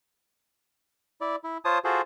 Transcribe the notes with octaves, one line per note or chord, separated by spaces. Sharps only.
E4 D5
E4
F4 C5 C#5 A5 D#6
F4 F#4 G#4 A4 C5